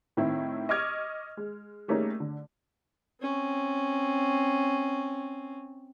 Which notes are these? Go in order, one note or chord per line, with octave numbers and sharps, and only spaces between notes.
A2 D#3 C4 E4
D#5 C#6 D6 F6 G#6
G#3
G3 A3 A#3 C#4 D#4 G#4
D3
C4 C#4